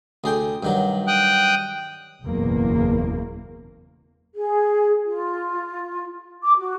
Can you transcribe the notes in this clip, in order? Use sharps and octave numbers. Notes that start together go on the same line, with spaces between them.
D2 G#4 G5
G2 D#3 F#3
G5 D#6 F#6
F#1 B1 E2 A#3
G#4
F4
D6
F#4